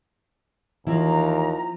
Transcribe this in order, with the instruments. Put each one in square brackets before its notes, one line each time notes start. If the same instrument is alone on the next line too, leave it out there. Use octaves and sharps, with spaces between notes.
[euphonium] D#2 [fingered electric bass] E3 [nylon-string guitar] F3 C4 E4 [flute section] A#5